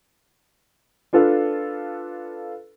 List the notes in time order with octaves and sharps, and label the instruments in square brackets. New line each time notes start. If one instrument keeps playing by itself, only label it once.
[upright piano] D4 F4 A4 B4 F5